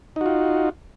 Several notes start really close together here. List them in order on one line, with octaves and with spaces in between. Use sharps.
D#4 F#4 F4